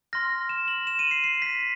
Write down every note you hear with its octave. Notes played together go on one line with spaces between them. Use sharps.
C6 F6 A#6
E7
F#7
E7
D#7
C7
C7
B6